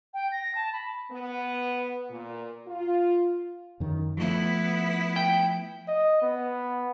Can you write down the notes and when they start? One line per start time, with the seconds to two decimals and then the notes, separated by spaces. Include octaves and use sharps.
0.14 G5
0.32 A#6
0.55 A5
0.73 B5
1.11 B3
2.10 A#2
2.67 F4
3.80 F#2 D#3
4.17 F3 A3 B3 E4
5.16 G5
5.88 D#5
6.22 B3